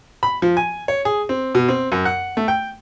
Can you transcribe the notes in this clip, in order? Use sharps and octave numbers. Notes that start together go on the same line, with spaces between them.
B5
F3
G#5
C#5
G#4
C4
B2
C4
F#2
F#5
A3
G5